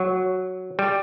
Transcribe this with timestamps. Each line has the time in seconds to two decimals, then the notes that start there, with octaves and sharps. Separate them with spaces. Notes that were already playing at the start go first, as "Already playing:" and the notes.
Already playing: F#3
0.79 G3